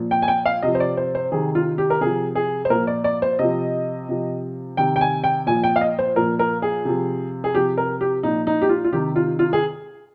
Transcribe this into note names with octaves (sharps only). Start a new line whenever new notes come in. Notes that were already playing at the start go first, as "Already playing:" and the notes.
Already playing: A#2 F3
G5
G#5
G5
F5
C3 F3 D#5
C5
D5
C5
C5
C3 D#3 G#4
F4
G4
A#4
C3 F3 G#4
G#4
C5
A#2 F3 A#4
D5
D5
C5
C3 F3 D#5
C3 F3
C3 D#3 G5
G5
G#5
G5
A#2 F3 G#5
G5
F5
D#5
C5
A#2 F3 A#4
A#4
G#4
C3 F3
G#4
C3 F3 G4
A#4
G4
A#2 F3 D#4
D#4
G4
F4
F4
C3 D#3 G4
F4
F4
G#4